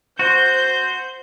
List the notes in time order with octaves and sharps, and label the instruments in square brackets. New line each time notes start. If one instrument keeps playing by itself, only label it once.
[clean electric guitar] F#4 [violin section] C5 G6